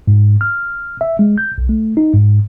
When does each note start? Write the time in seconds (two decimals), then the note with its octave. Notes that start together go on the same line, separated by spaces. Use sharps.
0.07 G#2
0.41 F6
1.01 E5
1.19 G#3
1.38 G6
1.58 B1
1.69 A3
1.97 D#4
2.13 G#2